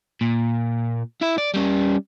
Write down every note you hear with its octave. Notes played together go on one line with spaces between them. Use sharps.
A#2
E4 E5
D5
G3 C#4